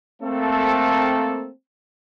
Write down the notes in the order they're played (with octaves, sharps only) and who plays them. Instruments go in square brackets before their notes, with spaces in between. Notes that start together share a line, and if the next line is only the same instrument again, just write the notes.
[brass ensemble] A3 A#3 C4 A4